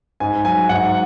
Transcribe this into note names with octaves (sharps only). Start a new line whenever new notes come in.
G#2 G#5
F#3 G#5
G#2 F#5